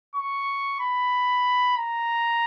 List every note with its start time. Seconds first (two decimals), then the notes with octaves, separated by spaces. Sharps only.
0.15 C#6
0.80 B5
1.77 A#5